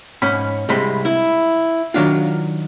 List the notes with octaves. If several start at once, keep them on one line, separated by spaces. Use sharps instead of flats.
G#2 C#4 B5
C2 C3 G#3 B5
E4
D#3 F#3 D4 F4